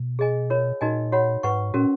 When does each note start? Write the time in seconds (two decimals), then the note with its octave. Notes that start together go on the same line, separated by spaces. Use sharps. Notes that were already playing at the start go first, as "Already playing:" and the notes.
Already playing: B2
0.19 G#4 D#5 G#5
0.50 F4 A#4 C#5
0.81 A#2 D#4 F#4 A#4 D#5 G#5
1.12 F#4 C#5 F#5 B5
1.43 G#2 B4 F#5 C#6
1.74 A#2 C#4 F#4 A#4